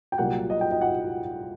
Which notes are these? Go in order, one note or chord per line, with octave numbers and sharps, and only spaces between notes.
G5
C2 A#2 F#3 A#3 F#5
D#5
G5
D#5
F#5